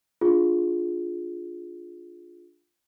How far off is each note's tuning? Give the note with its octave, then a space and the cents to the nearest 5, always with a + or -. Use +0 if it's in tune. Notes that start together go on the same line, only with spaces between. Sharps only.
D4 +0 F4 +0 G#4 +5